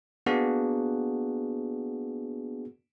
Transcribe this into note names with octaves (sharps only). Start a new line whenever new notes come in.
A#3 B3 D4 F#4 G#4